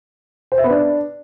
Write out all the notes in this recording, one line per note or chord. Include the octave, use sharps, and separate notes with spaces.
C5
E5
B3
D4